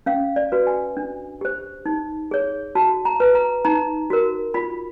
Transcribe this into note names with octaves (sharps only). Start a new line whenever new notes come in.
C#4 F5
D5
F#4 B4
G#5
D4
G4 C5
D#4
G#4 C#5
F#4 A5
A#5
B4
A#5
D#4 A#5
F#4 A#4
F4 B5